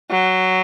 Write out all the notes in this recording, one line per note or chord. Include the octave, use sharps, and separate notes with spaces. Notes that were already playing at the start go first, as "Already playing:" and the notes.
F#3